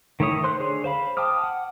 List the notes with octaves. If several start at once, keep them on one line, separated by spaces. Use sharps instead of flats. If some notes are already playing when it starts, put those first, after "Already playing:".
D#3 A3 E4 C#5 D#6
C5 C6 F#6
D3 G#4 C#5
C5 F5 B5
G5 A5 D6 D#6 F6
F#5